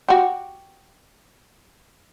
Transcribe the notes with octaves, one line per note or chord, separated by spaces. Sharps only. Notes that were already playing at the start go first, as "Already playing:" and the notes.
F#4 G4